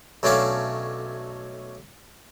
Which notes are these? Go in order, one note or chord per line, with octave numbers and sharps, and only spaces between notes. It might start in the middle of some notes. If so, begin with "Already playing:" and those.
B1 F#3 A3 C#4 D4 F5